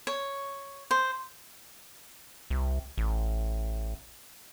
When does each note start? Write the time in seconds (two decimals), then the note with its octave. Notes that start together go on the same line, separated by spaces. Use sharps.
0.07 C#5
0.91 C5
2.50 C2
2.98 A1